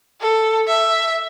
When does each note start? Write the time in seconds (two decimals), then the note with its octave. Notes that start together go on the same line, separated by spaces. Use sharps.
0.22 A4
0.68 E5